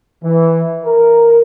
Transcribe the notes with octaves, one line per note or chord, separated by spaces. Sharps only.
E3
A#4